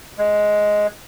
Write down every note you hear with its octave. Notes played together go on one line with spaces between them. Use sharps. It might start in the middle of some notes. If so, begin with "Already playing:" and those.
G#3